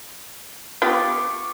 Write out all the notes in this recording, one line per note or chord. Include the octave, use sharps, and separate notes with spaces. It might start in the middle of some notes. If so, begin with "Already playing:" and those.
B3 F4 G4 C#6 D6